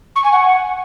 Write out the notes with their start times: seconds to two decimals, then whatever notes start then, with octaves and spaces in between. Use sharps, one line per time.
0.16 C#6
0.24 G#5
0.32 F#5